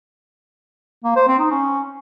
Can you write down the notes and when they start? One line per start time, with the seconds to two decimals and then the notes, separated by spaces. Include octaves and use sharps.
1.04 A#3
1.16 C5
1.28 C4
1.39 D#4
1.51 C#4